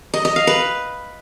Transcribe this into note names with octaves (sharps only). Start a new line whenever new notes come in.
D#5
D#5
F5
B4